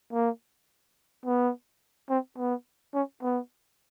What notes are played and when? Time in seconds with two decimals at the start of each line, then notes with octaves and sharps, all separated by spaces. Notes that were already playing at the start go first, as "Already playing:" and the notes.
0.13 A#3
1.26 B3
2.10 C4
2.38 B3
2.94 C#4
3.22 B3